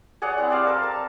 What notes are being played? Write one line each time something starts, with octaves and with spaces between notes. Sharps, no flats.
G#4 C#5 D5 F#5
C4 E4 F#5
G4 C5 D5 F5
A4 A#4
A5